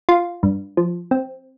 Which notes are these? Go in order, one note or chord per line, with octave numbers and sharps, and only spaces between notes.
F4
G2
F3
C4